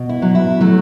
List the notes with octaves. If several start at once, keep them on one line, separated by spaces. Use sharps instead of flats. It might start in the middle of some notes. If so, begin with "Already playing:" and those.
Already playing: B2
E4
F#3
E4
F#3 A3